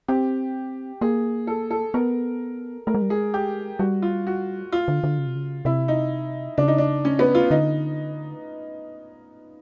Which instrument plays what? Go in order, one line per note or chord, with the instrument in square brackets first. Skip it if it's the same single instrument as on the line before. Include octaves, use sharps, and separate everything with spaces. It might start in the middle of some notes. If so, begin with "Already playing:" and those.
[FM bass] C4 [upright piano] G4
[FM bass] A#3 [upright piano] G#4
[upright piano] A4
A4
[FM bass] B3 [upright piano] A#4
[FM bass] A3 [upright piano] A#4
[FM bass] G#3
G3
[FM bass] G#3 [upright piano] G#4
[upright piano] G4
[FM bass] G3 [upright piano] F#4
[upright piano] F4
F#4
F4
[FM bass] D3
D3
C#3
C3
C#3
[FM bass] C3 [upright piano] E4
[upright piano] D#4
[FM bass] C#3 [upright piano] D4
[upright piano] D#4
D4
C#4
B3
F4
[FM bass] D3 [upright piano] D#4